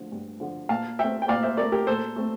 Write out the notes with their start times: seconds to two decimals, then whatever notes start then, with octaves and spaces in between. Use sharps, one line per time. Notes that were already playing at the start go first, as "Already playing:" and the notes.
Already playing: D3 F3
0.12 G2
0.40 D3 F3
0.69 A#2 F5 A5
0.99 A3 C4 E5 G5
1.22 G5
1.28 A#2 D5 F5
1.43 C5 E5
1.57 A3 C4 A#4 D5
1.72 G4 A#4
1.87 A#2 A4 C5
2.16 A3 C4